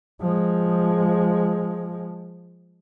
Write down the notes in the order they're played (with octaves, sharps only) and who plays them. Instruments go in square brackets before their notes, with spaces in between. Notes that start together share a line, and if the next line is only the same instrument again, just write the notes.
[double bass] F3 G#3